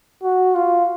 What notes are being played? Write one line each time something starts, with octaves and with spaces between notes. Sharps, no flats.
F#4
F4